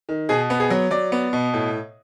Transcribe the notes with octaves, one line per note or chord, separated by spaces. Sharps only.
D#3
B2 G#4
B3
G#4
F#3
F#3 D5
B3
B2
A2